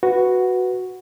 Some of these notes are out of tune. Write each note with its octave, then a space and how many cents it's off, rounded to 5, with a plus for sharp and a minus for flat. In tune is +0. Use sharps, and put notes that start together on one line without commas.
F#4 +0 B4 +0